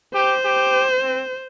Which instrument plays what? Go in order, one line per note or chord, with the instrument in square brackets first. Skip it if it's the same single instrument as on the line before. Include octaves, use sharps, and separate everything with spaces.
[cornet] G4 [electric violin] C5
[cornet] G4
C4